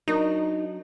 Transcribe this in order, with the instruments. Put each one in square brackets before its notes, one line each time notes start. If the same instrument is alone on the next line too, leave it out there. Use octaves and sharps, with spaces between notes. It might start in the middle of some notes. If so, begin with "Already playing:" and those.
[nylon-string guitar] F#3 D4 A#4 [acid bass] D#4